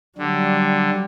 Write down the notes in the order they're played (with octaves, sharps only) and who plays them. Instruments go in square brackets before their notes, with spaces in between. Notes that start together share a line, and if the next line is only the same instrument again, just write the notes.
[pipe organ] D3 [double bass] F#3 G3